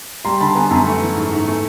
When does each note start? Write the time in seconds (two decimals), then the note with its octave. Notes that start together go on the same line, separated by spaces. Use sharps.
0.25 G3 A#5 C6
0.41 D3 A5 B5
0.55 B3 G#5 A#5
0.71 F#2 G#5 A#5
0.86 A3
1.02 E3
1.16 G#2
1.33 G#2
1.47 A3